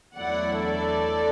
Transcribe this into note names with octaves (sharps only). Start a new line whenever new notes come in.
E2 D3 F#3 A3 E4 D5 F#5
A4 D5